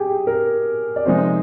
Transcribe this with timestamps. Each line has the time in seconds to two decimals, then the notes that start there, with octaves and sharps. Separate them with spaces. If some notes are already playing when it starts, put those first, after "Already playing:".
Already playing: G4 G#4
0.27 A#4
0.96 D5
1.05 C3 F3 G#3 D#4 C5